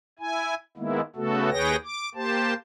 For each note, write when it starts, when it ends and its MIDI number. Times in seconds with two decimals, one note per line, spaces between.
0.19 0.54 64
0.19 0.54 80
0.77 1.01 51
0.77 1.01 56
0.77 1.01 58
0.77 1.01 59
0.77 1.01 64
1.16 1.50 49
1.16 1.50 57
1.16 1.50 59
1.16 1.50 66
1.16 1.50 69
1.51 1.76 39
1.51 1.76 68
1.51 1.76 71
1.51 1.76 73
1.51 1.76 79
1.51 1.76 94
1.84 2.09 86
2.15 2.54 58
2.15 2.54 67
2.15 2.54 72
2.15 2.54 81